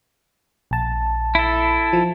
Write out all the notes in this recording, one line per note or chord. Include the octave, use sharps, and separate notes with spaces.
A#1 A5
E4 A4
F3